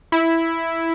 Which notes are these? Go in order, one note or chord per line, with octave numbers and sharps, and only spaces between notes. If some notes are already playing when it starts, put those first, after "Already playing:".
E4